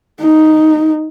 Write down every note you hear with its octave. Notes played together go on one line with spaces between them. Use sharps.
D#4